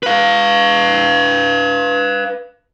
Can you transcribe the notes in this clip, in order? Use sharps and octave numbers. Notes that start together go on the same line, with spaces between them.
B4 F5